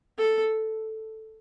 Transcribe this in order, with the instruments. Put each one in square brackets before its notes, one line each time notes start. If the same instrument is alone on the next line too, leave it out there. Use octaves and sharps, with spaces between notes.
[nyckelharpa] A4